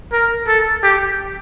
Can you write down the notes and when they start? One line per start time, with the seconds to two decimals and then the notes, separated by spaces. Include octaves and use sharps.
0.12 A#4
0.48 A4
0.83 G4